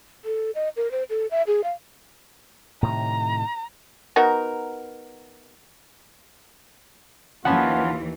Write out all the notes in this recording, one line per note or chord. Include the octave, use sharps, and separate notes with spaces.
A4
D#5
A#4
C5
A4
E5
G#4
F5
A2 C3 D#3 A#5
B3 D#4 F#4 A#4
D#2 E3 F3 C#4 F4 F#5 B5